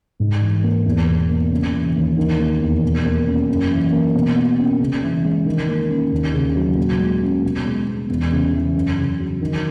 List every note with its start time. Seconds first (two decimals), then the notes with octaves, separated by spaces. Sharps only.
0.20 G#2
0.41 E3
0.64 A#3
0.85 E2
1.07 B2
1.29 A#3
1.51 C#3
1.74 E3
1.95 D#2
2.17 D#3
2.39 A#3
2.61 E2
2.83 B2
3.05 A#3
3.26 C#4
3.49 F#2
3.71 E3
3.93 A#3
4.15 B2
4.36 A#3
4.58 C#4
4.80 C#3
5.02 E3
5.25 G#3
5.46 D#3
5.69 A#3
5.89 C#4
6.12 D#2
6.34 C#3
6.56 F#3
6.77 A#2
6.99 G#3
7.22 C#4
7.44 B2
7.65 G#3
7.87 B3
8.10 E2
8.32 C#3
8.54 E3
8.75 F#2
8.97 C#3
9.19 F#3
9.41 D#3